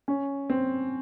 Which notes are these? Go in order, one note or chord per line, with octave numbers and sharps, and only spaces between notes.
C#4
C4